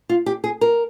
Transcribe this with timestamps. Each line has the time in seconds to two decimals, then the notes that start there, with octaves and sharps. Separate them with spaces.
0.09 F4
0.26 G4
0.44 G#4
0.61 A#4